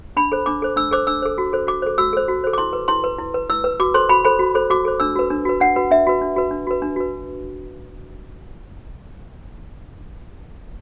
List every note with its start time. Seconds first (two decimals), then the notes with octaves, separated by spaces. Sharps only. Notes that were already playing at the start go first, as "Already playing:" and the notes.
0.17 D4 B5
0.32 A4 C5
0.46 D4 D6
0.62 A4 C5
0.76 D4 E6
0.91 A4 C5 D6
1.07 D4 E6
1.22 A4 C5
1.38 F#4
1.53 A4 C5
1.67 F#4 D6
1.82 A4 C5
1.98 F#4 E6
2.13 A4 C5
2.28 F#4
2.44 A4 C5
2.53 D6
2.58 E4 C6
2.73 B4
2.88 E4 C6
3.04 B4
3.18 E4
3.34 B4
3.50 E4 E6
3.64 B4
3.80 F#4 D6
3.94 A4 C5 C6
4.09 F#4 B5
4.25 A4 C5 B5
4.39 F#4
4.55 A4 C5
4.70 F#4 D6
4.85 A4 C5
5.00 D4 E6
5.16 F#4 B4
5.30 D4
5.45 F#4 B4
5.60 D4 F#5
5.76 F#4 B4
5.91 D4 E5
6.07 F#4 B4
6.22 D4
6.36 F#4 B4
6.51 D4
6.67 F#4 B4
6.82 D4
6.96 F#4 B4